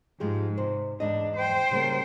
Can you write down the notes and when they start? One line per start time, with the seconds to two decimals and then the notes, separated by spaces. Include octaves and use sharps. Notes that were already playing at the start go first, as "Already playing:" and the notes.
0.20 G#2 F3 G#3 G4
0.57 C3 C5
1.00 E2 G#2 D4 D#5
1.36 C5 G5
1.71 C#3 G3 A#3